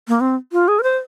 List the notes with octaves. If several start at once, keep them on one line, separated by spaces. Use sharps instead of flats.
A#3
C4
F4
G#4
A#4
C5